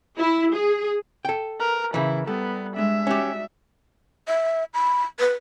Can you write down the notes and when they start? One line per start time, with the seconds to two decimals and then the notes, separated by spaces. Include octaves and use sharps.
0.19 E4
0.54 G#4
1.25 A4 G5
1.60 A#4 B4
1.94 C#3 E3 E4
2.27 G3 B3 A4
2.76 G#3 D4 E5
3.07 C#4 D#4 F#4 G4 D5
4.28 E5
4.74 B5
5.20 B4